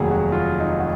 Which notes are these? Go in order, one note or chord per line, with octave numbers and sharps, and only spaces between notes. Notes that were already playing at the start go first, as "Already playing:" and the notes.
Already playing: F1 D#2 D#3 F#3 G#4 F#5
F#4
F4
D#4
F#4